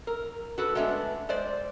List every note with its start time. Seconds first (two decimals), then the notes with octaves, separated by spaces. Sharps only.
0.07 A#4
0.58 F#4 A4 B4
0.75 G#3 A3 B3 C#4 D4
1.29 G#3 C5 D5